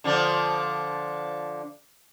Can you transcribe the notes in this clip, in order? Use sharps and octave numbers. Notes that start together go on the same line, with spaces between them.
D3 F3 D4